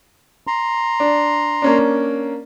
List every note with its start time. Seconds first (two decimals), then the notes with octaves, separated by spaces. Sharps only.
0.47 A#5 C6
1.00 D4
1.62 A#3 C#4 D4